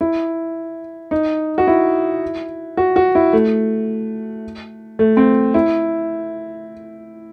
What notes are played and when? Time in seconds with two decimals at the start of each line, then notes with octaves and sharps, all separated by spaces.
0.01 E4
1.11 D#4
1.58 F#4
1.67 E4
2.77 F#4
2.96 F#4
3.15 E4
3.33 A3
4.99 A3
5.17 C4
5.54 E4